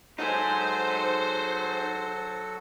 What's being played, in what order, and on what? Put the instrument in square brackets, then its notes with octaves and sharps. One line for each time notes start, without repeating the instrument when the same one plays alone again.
[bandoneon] F#3 F#4 A4 [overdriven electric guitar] D#4 G#4 [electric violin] C5